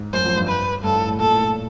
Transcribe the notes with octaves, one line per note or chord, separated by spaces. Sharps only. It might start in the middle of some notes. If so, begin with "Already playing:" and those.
Already playing: G#2
F#2 C5
F2
G2
B4
G2 A4
A2
A2
A#2 A4
A2
A#2